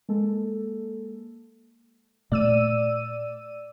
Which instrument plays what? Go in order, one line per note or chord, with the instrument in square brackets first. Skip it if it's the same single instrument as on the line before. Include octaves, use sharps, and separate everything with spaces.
[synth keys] G#3 A#3 A4
[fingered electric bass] A#2 A3 [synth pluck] D5 E6 D#7